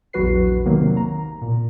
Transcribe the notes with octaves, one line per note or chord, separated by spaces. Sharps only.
A#1 E2 F#3 F#4 B4 C7
C3 D#3 F#3 A#3
A#5
A#2